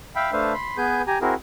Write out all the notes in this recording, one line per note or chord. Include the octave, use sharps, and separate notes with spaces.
E5 F5 G5 B5
A3 D4 B4 C5 E5 F5
B5 C6
B3 G#4 B4 G#5 G6
G4 G#5 A#5
C4 E4 F#4 G#4 A#4